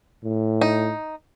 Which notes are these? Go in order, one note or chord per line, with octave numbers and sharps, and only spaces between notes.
A2
D#4